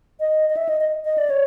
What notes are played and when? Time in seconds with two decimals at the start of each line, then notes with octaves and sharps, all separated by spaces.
0.20 D#5
0.50 D#5
0.57 E5
0.69 D#5
0.81 D#5
1.05 D#5
1.18 D5
1.30 C#5